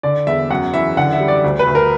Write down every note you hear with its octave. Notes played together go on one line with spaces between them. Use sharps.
D3 D5
E2 E5
F#2 F#5
E3 E5
D3 F#5
E5
G3
D5
D2
B4
D2
A#4